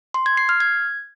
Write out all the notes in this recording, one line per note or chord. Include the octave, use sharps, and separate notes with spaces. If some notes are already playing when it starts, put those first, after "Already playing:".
C6
G#6
C7
F6
G#6